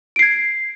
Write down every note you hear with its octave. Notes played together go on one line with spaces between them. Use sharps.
G#6 C7 D7